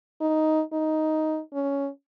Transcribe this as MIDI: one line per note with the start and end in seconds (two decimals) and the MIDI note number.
0.21 0.62 63
0.73 1.40 63
1.53 1.89 61